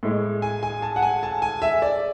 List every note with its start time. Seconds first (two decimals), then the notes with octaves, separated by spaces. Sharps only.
0.03 A2 G#3
0.42 G#5
0.63 G#5
0.82 A5
0.96 F#5
1.02 G#5
1.23 A5
1.42 G#5
1.62 E5
1.82 D5